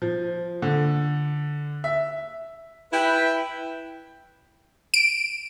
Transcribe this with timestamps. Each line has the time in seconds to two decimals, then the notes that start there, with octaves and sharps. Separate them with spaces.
0.02 F3
0.62 D3
1.84 E5
2.93 E4 B4 G5
4.94 D7